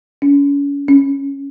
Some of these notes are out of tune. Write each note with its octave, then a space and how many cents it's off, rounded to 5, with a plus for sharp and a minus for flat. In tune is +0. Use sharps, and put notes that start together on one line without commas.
C#4 +35
C#4 +0